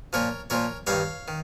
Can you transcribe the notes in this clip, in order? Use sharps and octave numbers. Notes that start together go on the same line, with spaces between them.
A#2 F3 A#4 C#5
A#2 F3 A#4 C#5
G2 D#3 C#5 F5
D#3